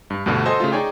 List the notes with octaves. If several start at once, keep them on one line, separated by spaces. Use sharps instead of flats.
G2
D2 G2 B2 D3
F#4 A4 C5 D#5 G#5
C#3 A3 F4
D#4 G#4 C#5 D5 G5